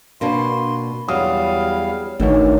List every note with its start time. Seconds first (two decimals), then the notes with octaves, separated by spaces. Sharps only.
0.21 B2 A#3 D4 C6
1.08 E2 F#3 G3 F5 D#6
2.20 G#1 D2 A2 D#3 E3 C#5